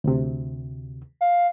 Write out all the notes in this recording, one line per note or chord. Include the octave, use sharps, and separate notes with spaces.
D2 C3
F5